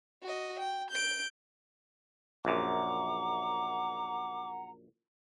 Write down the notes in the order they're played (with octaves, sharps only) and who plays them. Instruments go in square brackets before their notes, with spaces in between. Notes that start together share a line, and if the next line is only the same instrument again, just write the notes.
[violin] F#4 D#5
G5
G6 D7
[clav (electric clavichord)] A#1 F#2 [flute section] F#5 A#5 [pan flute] D6